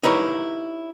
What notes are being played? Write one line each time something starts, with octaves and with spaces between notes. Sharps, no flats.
D#4 E4 G4 A#4 B4 C#5